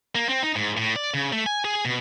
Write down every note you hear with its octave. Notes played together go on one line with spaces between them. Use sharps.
A#3
C4
D#4
G#2
A2
D5
C#3
A3
G#5
G#4
B2